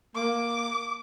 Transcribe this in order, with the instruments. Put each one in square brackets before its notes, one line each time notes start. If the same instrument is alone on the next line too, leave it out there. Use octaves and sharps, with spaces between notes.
[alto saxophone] A#3 [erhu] D6